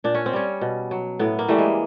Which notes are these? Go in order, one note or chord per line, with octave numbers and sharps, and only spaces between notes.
A#2 D4
C#4
C4
G3 C#4
B2
F#3
A2 B3
A#3
E3 G3 A3
G#3